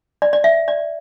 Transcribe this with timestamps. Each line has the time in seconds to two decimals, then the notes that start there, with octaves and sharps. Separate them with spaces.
0.22 D5
0.33 D5
0.44 E5
0.68 D5